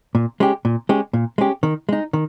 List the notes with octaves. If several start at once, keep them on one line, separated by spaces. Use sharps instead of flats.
A#2
G#3 C#4 G4
A#2
G#3 C#4 G4
A#2
G#3 C#4 G4
D#3
G#3 D#4
D#3